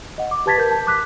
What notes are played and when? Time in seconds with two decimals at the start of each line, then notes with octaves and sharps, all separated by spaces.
0.18 D#5 F#5
0.31 D6
0.46 G4 B4 A5 G#6 A6 B6
0.58 A#4 G6
0.71 A5
0.87 D6 F#6 B6